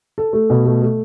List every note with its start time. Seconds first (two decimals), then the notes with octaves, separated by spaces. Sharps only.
0.18 A4
0.33 A3
0.50 B2
0.66 A3
0.82 A3